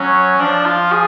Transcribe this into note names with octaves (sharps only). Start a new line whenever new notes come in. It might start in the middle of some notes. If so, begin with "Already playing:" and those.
Already playing: F#3 C#4
F3 D4
F4
G#4